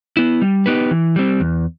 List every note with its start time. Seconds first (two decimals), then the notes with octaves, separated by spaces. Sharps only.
0.17 B3 E4
0.42 G3
0.66 B3 D#4 G4 B4
0.91 E3
1.16 G3 C4
1.40 E2